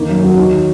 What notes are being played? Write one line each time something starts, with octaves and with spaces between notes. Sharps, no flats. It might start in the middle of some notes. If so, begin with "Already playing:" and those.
Already playing: D#3 A#3
F#2
F#3
D#3